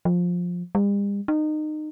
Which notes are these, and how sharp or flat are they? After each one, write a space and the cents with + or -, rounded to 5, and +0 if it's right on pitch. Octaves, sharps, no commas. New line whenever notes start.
F3 +15
G3 +45
D#4 -25